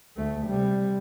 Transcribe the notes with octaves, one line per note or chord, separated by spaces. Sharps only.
D2 A3
C3 G3